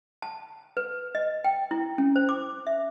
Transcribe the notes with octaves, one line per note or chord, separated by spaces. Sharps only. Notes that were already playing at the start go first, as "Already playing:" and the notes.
A5
B4
D#5
G5
E4
C#4
C5
D6
E5